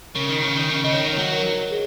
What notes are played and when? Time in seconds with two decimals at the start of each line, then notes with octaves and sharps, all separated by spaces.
0.15 C#3 A#4
0.29 D#3
0.42 C#3
0.56 D#3
0.70 C#3
0.84 C#3 D#5
0.93 D#3 C#5
1.13 C#5
1.18 F#3
1.32 A#4
1.52 C#5
1.71 G#4